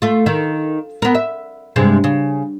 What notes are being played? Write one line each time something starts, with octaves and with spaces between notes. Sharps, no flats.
A3 F4
D#3
B3 A#4
E5
G2 C3 G#3
C#3